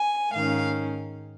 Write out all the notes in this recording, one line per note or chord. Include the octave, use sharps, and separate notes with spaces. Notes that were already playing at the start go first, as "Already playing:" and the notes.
Already playing: G#5
G#2 D#3 C#4 F5